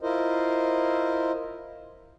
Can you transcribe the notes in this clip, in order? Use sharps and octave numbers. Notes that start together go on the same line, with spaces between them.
E4 F4 A#4 C5 D#5